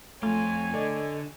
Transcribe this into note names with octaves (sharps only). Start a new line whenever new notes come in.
F2 A3 F4 C#5 G#5
D3 A4 D5 D#5